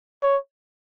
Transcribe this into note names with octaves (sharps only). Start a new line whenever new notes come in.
C#5